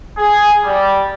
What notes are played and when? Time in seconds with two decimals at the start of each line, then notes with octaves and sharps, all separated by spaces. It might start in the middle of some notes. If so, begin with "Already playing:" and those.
0.18 G#4
0.63 G3